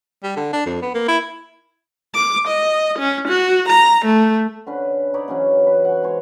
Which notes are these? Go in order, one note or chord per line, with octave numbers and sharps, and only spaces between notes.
G3
D3
D4
F2
B3
A#3
E4
D6
D#5
C#4
F#4
A#5
A3
D3 C#4 B4
D#4 B4 C#5 D5
C#3 E3 F#3 C#4
C#4 B4
F#5 G#5
G#3 C5 C#5